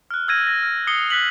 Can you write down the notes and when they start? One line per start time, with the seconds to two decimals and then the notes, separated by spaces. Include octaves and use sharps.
0.11 F6 F#6
0.28 E6 F6 G#6 A#6 D#7
0.47 A#6
0.63 F6
0.87 D#6 C7 C#7 G7
1.10 F#6 B6 F#7